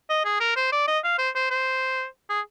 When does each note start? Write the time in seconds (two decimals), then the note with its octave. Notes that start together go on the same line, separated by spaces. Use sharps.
0.09 D#5
0.25 G#4
0.40 A#4
0.56 C5
0.72 D5
0.87 D#5
1.04 F5
1.18 C5
1.35 C5
1.50 C5
2.29 G#4